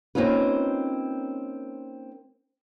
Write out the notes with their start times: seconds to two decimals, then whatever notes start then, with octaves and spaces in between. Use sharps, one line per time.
0.15 A#3 C4 C#4 D#4 F4 B4